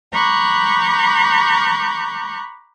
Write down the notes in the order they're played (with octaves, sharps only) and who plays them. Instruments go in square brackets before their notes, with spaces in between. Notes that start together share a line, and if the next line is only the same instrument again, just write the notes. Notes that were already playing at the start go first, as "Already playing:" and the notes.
[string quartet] A#5 B5 C#6 D6 F#6 G6